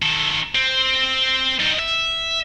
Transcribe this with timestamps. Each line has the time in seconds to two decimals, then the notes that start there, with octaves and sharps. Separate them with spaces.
0.02 D#3 A4
0.55 C4
1.60 G3 D#4
1.79 E5